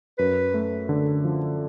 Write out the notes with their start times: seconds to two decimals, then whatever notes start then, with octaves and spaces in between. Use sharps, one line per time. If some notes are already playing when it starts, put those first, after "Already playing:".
0.18 F#2 B4
0.54 A3
0.89 D3
1.25 F3